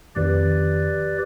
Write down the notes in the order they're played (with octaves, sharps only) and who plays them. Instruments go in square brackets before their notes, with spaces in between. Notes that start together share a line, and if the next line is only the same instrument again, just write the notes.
[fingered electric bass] F2 D#3 [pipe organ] G4 B4 D5